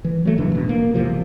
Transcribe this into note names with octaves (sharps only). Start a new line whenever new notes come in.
E3
F#3 A3
D#2 C3 E3 D4
E1 A1 B2
A#3
G#1 E2 C3 F3